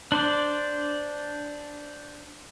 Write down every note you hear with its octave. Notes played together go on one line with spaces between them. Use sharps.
D4 C5 D5